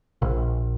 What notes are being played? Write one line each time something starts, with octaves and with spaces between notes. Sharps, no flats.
A#1